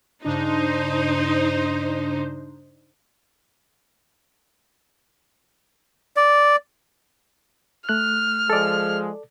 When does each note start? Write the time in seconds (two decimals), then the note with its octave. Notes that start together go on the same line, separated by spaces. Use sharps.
0.25 G2 C#3 D4 D#4 C5
6.17 D5
7.89 A3 F6 F#6
8.50 F3 G#3 A4 D5